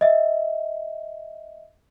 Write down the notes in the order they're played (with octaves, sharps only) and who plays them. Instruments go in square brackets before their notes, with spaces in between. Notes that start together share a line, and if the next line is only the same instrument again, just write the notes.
[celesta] D#5 E5